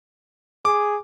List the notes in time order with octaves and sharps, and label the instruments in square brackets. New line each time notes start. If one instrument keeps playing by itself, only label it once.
[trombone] G#4 [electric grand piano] D6